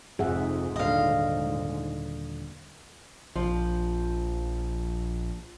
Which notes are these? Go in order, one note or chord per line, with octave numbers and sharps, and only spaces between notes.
F1 F2 G#2 G#4 E5 F#5
D#1 D3 D#5 F5
A#1 F3